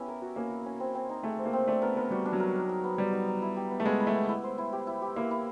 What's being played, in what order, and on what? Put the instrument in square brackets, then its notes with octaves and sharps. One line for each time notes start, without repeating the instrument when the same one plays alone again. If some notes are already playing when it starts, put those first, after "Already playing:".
Already playing: [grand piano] B3 [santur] C#4 E4 G4
[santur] A#4
F#4
[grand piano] A#3 [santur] C#4
[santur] F#4
C#4
C4
C4
D#4
[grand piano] A3 [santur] G#4
[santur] C4
[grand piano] A#3
[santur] C4
[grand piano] A3 [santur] D4
[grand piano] B3 [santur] A#4
[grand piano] B3 [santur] A#4
[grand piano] G3 [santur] F#4
[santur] D4
[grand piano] F#3
[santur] A#4
D#4
D#4
B3
[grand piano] G3 [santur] B3
[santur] D#4
D#4
E4
G4
B3
[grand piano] A3
[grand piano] G#3 [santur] B3
[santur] E4
[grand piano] A3
[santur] B3
E4
C5
E4
G4
E4
G4
[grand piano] A#3 [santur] E4
[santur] E4